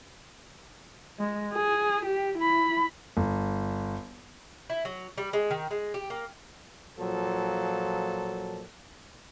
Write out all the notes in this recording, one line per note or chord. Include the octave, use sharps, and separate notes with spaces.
G#3
G#4
G4
E4 B5
G1
E4
F#3
G3
G#3
D#3
G#3
G4
A#3
A#2 F3 F#3 A4